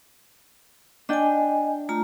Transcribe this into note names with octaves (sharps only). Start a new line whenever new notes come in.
D4 D#5 G5 G#5
A3 F4 A#5